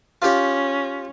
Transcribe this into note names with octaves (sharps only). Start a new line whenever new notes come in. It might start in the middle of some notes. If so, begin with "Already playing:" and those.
C#4 F4 G4